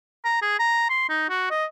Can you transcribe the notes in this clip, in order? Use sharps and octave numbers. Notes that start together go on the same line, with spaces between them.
A#5
G#4
A#5
C6
D#4
F#4
D#5